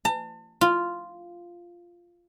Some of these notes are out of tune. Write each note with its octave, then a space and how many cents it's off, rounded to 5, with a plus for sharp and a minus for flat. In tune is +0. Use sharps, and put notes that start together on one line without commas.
A5 +40
F4 -5